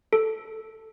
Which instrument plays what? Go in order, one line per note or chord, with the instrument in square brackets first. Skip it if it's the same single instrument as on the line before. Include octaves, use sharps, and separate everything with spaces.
[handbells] A4